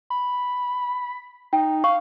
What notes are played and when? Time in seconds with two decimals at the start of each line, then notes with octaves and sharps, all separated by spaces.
0.10 B5
1.53 D#4 G5
1.84 F5 C#6